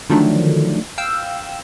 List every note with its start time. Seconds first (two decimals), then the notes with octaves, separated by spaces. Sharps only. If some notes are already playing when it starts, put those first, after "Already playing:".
0.10 D3 D#3 F3 F#3 A3 D4
0.98 F5 G5 E6